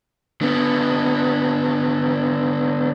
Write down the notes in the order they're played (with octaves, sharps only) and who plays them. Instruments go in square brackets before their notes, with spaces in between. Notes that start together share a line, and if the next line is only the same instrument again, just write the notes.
[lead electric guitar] D3 B3